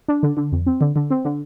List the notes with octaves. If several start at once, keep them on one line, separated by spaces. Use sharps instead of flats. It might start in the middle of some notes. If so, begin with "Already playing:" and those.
D4
D3
D3
F2
C4
D3
D3
C4
D3